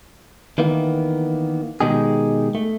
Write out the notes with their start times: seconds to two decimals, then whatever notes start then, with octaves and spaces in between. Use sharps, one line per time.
0.58 D#3 E3 A#3 B3
1.81 B2 D#3 G#3 D#4 G4 G#4
2.55 A3